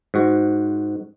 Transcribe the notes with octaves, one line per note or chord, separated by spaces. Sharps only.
G#2 F#4